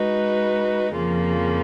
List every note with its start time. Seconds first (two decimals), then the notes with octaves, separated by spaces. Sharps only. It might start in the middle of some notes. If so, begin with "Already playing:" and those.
Already playing: G#3 D#4 F#4 B4
0.95 F2 C#3 F3 A#3 F4